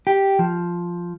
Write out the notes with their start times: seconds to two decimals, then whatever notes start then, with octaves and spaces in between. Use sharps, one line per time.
0.07 G4
0.39 F3